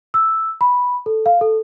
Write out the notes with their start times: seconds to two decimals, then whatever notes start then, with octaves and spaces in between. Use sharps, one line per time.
0.14 E6
0.61 B5
1.06 A4
1.26 F5
1.41 A4